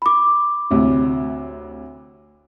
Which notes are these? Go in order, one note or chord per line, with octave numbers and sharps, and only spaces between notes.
B5 D6
D2 A2 C3